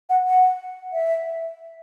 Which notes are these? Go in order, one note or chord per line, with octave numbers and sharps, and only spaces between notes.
F#5
F#5
E5